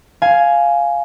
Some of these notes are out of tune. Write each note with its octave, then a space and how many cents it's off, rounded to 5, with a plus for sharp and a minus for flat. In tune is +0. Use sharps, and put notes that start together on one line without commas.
F5 +0 G#5 +10